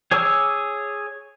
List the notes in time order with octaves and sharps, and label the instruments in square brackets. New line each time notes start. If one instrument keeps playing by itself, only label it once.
[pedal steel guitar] G#4 C#5 G#5 D6 E6